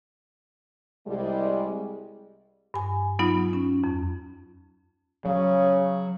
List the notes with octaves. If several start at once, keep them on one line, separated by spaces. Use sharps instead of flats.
C2 G3 G#3
G2 G#5
F#3 B3 D#4 F4
C#4
F2
C#3 F#3